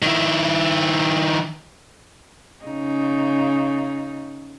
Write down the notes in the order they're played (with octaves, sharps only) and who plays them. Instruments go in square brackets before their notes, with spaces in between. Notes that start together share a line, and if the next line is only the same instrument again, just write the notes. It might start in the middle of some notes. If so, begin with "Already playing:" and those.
[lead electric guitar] D#3 E4
[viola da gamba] C#3 D#4